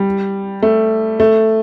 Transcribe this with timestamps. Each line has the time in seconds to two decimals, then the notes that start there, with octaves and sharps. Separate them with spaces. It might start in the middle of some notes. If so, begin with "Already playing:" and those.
Already playing: G3
0.62 A3
1.20 A3